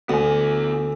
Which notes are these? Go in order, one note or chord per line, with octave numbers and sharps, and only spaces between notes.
D2 B3 G#5